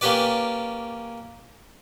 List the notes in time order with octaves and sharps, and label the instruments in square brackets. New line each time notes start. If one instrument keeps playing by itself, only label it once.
[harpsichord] A#3 C#4 G4 B4 D5